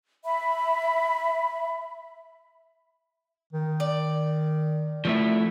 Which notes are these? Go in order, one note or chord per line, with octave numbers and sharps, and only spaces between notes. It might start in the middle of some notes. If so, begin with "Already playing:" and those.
E5 B5
D#3
D5
F3 A3 E4